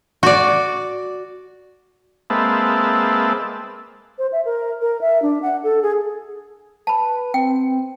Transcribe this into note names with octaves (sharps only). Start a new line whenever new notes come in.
F#4 D5
G#3 A#3 C4 B4 E5 A5
C5
E5
A#4
A#4
E5
D4
F#5
A4
G#4
B4 A5 B5
C4 G5